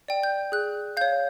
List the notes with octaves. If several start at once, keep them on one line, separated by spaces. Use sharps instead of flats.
D5 G5
G6
G#4 F#6
C#5 F5 G6